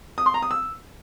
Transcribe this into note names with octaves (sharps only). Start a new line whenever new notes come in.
D#6
C6
A#5
D#6
E6